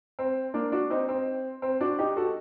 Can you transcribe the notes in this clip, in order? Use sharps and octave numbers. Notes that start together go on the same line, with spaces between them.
C4
A#3 D4
D4 F#4
C4 D#4
C4
C4
D4 F#4
D#4 G4
F#4 A4